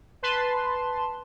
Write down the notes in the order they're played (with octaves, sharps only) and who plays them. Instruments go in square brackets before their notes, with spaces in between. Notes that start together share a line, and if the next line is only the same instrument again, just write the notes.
[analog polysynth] B4 A5 C6